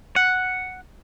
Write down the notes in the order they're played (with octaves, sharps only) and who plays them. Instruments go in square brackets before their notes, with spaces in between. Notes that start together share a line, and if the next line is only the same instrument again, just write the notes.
[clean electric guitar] F#5